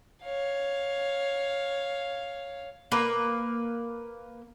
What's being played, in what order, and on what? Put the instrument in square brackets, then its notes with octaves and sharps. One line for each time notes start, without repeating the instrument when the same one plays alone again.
[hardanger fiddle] C#5 F5
[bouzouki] A#3 B4